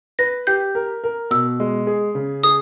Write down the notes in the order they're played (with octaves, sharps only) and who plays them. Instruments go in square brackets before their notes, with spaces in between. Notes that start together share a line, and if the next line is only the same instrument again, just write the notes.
[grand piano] B4 [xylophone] A#6
[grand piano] G4 [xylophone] G6
[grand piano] A#4
A#4
[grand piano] B2 [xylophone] E6
[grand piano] G#3
G#4
C#3
[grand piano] G#4 [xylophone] D#6